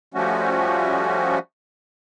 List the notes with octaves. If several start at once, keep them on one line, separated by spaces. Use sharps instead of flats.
F3 G3 A3 C#4 F#4